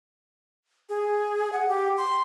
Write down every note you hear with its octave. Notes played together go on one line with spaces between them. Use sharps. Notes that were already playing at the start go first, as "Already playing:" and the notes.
G#4
F#5
G4
C6